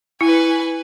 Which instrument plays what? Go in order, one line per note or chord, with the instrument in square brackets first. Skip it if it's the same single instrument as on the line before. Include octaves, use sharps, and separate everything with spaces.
[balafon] E4 [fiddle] B4 G#5